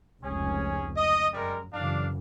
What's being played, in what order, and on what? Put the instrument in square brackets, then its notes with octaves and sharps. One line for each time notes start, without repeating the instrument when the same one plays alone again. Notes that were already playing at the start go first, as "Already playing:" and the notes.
[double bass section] F1 C#2 [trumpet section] C#4 G#4
[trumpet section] D#5 D#6
[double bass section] F#2 [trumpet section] G3 G#3 A#4
[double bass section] F#2 C#3 E3 [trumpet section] D4 F5